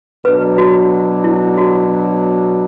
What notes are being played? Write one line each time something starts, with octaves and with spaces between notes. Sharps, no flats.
B2 F#3 D4 B4
F#4
E4
F#4